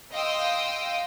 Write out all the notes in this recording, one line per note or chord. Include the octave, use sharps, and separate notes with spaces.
D#5 F5 G5 C6 D#6 E6